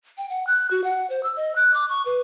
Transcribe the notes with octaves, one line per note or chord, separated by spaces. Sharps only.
G5
F#5
F#6
F#4
F#5
C5
E6
D#5
F#6
D6
C#6
B4